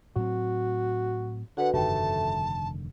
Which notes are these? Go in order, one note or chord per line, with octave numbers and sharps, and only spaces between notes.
A2 F#3 C4 F#4
D3 F#4 B4 F#5
F1 G2 D3 D#3 A3 G5 A5